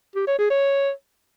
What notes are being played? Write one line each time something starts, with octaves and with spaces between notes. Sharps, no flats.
G4
C#5
G#4
C#5